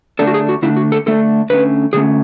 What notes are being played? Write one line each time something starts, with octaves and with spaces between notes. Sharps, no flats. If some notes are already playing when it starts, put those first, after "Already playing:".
D3 A3 D4 A4
F#4
G#4
F#4
D3 A3 D4 E4
F#4
A4
D3 A3 D4 A4
D3 A3 C#4 B4
D3 A3 C#4 G#4